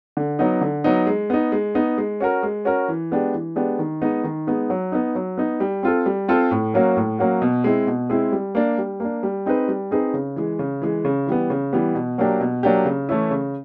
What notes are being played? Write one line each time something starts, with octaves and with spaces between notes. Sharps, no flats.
D3
F#3 B3 D#4
D3
F#3 B3 D#4
G#3
B3 D#4
G#3
B3 D#4
G#3
C#4 F#4 A#4
G#3
C#4 F#4 A#4
E3
G#3 B3 D4 G4
E3
G#3 B3 D4 G4
D#3
G#3 B3 D#4
D#3
G#3 B3 D#4
F#3
B3 D#4
F#3
B3 D#4
G3
C4 F4 A4
G3
C4 F4 A4
A2
F#3 A#3 C#4 F#4
A2
F#3 A#3 C#4 F#4
B2
G#3 C4 E4
B2
G#3 C4 E4
G3
A#3 D4
G3
A#3 D4
G3
C4 D#4 G#4 B4
G3
C4 D#4 G#4 B4
C#3
E3 G#3
C#3
E3 G#3
C#3
E3 G3 B3
C#3
E3 G3 B3
B2
F#3 A#3 D4 G4
B2
F#3 A#3 D4 G4
C#3
E3 A3 C#4 E4
C#3